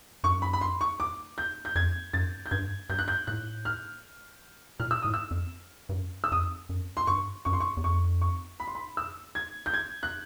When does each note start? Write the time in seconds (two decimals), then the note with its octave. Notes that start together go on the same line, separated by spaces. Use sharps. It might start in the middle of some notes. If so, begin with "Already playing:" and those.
0.24 F#2 C#6
0.42 B5
0.53 B5
0.61 C6
0.81 C#6
1.00 D6
1.38 G6
1.65 G6
1.75 F2 G#6
2.13 F#2 A6
2.46 G6
2.51 G2 G#6
2.89 G2 G6
2.99 F#6
3.08 G6
3.27 A2 F#6
3.65 F6
4.80 A#2 F6
4.91 E6
5.02 A2 D#6
5.14 E6
5.31 F2
5.89 G2
5.93 F#2
6.24 E6
6.32 F2 D#6
6.69 F#2
6.97 C6
7.07 G2 C#6
7.45 F#2 C#6
7.53 C6
7.60 C#6
7.77 E2
7.83 F2 C#6
8.21 C#6
8.60 B5
8.68 C6
8.75 B5
8.97 E6
9.35 G#6
9.66 G6
9.74 G#6
10.03 F#6